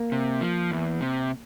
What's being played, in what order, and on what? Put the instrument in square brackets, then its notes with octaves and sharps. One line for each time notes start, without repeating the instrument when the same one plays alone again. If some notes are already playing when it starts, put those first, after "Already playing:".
Already playing: [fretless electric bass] A#3
[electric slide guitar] C3
F3
E2
C3